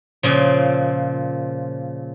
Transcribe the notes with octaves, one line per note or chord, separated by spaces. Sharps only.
A#2 C#3 F3